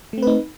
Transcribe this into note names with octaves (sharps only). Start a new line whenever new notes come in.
A3 C4 D#4 B4